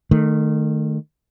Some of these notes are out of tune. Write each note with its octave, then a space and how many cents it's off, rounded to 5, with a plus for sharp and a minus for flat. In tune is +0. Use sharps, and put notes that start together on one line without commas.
D#3 -25 A3 +0